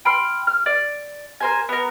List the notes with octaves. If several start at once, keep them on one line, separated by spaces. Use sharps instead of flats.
G5 B5 C6 F6
F6
D5
A#4 C5 G#5
B3 A#4